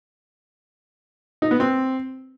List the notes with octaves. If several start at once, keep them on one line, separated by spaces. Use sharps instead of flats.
D#4
B3
C4